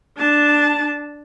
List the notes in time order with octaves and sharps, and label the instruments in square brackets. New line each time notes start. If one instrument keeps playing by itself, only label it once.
[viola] D4 A5